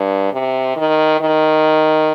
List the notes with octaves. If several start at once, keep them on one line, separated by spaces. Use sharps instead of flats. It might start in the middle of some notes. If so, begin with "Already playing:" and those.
Already playing: G2
C3
D#3
D#3